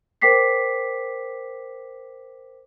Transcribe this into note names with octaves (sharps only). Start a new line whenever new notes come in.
A#4 C5 G5 D6 B6 C7